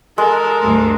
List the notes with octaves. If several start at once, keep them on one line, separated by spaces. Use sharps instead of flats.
G#3 A4 A#4
D2 G2